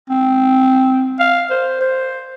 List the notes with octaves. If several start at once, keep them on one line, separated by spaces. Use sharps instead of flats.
C4
F5
C5
C5